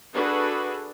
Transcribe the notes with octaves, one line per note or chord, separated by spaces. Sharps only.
D4 F#4 G#4 A4 B4